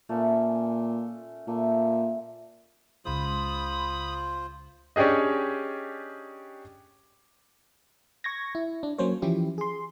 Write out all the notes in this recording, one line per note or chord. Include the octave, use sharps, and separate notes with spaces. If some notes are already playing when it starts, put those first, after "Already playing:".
A#2 A3 C#4 C#5
A#2 A3
C#2 C#3 G#3 F4 C5 B5 D#6
C#4 D4 G4 G#4 D#5
C#6 G#6 A#6
E4
D4
F#3 A#3 C#4 C5 C#5
E3 F3 C#4 E4 G4
G#4 C6